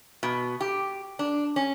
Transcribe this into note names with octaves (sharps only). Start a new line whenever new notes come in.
B2
G4
D4
C#4